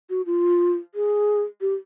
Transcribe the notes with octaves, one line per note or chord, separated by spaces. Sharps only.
F#4
F4
G#4
G4